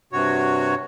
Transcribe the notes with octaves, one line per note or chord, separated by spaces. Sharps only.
G2 C3 F#4 C#5